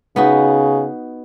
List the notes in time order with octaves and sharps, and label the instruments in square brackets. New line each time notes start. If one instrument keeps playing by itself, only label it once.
[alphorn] C#3 [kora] B3 D#4 F#4